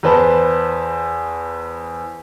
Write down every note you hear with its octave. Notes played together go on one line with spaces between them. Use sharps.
E2 B4 C5 A5